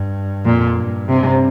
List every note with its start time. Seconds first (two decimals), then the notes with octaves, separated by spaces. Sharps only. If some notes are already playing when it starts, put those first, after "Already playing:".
Already playing: G2
0.44 F2 A#2
0.77 G2
1.08 C3